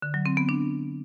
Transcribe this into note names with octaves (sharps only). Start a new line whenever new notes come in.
D3
F#3
C4
B3
D4